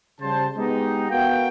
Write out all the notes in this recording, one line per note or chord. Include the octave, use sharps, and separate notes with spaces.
C#3 G3 C5 A5
G#3 B3 D#4 G4
B3 F#4 A#4 F5 G5